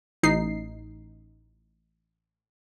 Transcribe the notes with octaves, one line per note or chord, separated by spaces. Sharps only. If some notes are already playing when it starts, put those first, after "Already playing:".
A1 D#4 C7